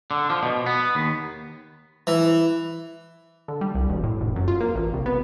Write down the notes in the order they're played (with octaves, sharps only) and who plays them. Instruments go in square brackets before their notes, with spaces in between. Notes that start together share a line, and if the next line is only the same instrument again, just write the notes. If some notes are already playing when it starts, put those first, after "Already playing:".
[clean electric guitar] D3
F3
B2
B3
D#2
[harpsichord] E3
[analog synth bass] D3
G3
C2
E1
A2
F1
F#2
F4
A#3
A1
C2
B3